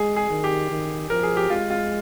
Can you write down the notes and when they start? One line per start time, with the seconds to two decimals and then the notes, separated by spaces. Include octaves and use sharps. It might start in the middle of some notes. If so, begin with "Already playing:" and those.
Already playing: G#3 G#4
0.16 G#4
0.30 D#3
0.44 G4
0.70 D#3
1.10 F3 A#4
1.23 G#4
1.37 G4
1.50 G#3 F4
1.70 F4